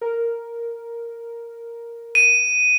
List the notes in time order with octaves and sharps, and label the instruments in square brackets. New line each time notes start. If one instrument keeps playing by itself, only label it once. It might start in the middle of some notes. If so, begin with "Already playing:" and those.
[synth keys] A#4
[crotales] D#7